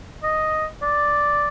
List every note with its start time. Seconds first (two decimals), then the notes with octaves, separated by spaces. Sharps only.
0.23 D#5
0.82 D5